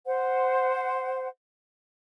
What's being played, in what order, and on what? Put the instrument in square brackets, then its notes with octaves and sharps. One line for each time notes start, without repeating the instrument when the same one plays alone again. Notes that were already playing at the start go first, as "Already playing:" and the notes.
[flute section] C5 F#5